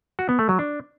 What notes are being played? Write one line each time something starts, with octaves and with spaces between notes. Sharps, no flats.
F#4
B3
A3
F#3
D4